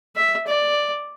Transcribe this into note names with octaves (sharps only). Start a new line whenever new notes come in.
E5
D5